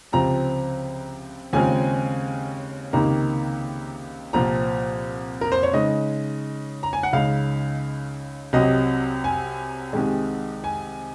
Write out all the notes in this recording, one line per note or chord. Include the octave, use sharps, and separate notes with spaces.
C#2 C3 F3 C4 F4 A#5
D#2 C#3 G#3 C4 F4 G#5
C#2 C3 D#3 A#3 D#4 A#5
C2 A#2 F3 C4 A#5
A#4
C5
C#5
C#3 G#3 D#4 D#5
A#5
G#5
F#5
C#2 C#3 G#3 D#4 F5
C2 C3 F#3 D#5
G#5
C2 C3 D#3 G#3
G#5